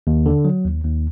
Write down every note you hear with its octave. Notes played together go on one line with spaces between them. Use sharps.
D#2
D3
F#3
D#2
D#2